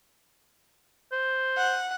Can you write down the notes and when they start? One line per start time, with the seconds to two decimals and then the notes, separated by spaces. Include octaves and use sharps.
1.12 C5
1.57 F#5